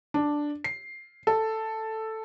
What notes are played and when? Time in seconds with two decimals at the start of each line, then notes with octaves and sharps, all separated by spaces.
0.14 D4
0.64 C7
1.27 A4